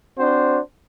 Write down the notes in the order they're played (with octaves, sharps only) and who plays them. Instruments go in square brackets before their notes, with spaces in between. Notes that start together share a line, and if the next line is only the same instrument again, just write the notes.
[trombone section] C4 D4 F#4 C5